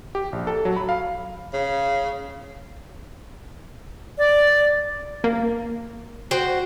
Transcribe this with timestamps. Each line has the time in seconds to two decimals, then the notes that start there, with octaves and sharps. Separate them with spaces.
0.15 G4
0.33 A#1
0.47 A4
0.65 F#3
0.76 B5
0.89 F5
1.53 C#3
4.18 D5
5.24 A#3
6.31 F#4 C5 G5